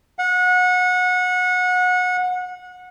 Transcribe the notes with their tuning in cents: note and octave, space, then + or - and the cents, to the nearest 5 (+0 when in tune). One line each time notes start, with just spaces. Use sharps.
F#5 -25